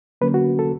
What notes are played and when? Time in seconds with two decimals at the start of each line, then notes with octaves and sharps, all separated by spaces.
0.21 D3 F#3 A#3 C#4 B4
0.34 F#4
0.59 A4